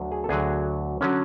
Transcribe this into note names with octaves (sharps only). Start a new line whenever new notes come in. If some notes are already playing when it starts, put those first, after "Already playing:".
Already playing: D2 D3 F#3
G#4
A4
D2 D3 F#3 G#4
D3 F#3 C#4